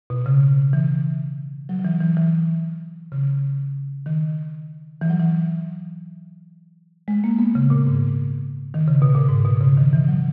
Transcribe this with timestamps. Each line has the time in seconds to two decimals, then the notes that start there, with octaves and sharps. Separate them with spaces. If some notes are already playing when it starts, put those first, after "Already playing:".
0.10 B2
0.26 C#3
0.73 E3
1.69 F#3
1.79 F#3
1.85 E3
2.01 E3
2.17 E3
3.12 C#3
4.06 D#3
5.01 E3
5.10 F#3
5.20 E3
7.08 G#3
7.24 A#3
7.39 B3
7.55 C#3
7.70 A#2
7.87 G#2
8.74 D#3
8.88 C#3
9.02 B2
9.15 A#2
9.29 G#2
9.45 B2
9.61 C#3
9.77 D#3
9.93 E3
10.08 F#3